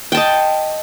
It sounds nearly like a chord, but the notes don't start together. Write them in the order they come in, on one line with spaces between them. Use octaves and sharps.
G5 A5 D#5